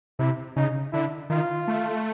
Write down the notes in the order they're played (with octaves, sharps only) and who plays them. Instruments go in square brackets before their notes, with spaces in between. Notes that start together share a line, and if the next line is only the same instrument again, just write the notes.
[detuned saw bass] C3 [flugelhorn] E4
[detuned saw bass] C#3 [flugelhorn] D#4
[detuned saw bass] D3 [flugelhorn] E4
[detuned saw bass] D#3 [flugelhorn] F4
[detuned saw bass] A3